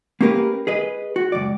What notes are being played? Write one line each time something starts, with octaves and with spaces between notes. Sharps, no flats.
A#3 C#4 G4 A#4 B4
G#4 B4 D#5
F#4
C#2 F#2 D5